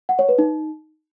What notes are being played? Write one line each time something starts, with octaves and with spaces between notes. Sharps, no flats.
F#5
C#5
B4
D#4